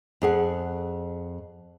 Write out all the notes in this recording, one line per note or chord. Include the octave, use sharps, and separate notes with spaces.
F2 G#4 F#5